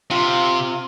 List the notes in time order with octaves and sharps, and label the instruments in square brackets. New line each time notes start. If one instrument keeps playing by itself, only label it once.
[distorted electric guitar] C3 [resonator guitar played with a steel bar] F4